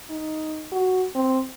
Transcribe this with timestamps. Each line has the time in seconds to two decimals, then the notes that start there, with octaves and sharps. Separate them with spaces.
0.10 D#4
0.72 F#4
1.15 C4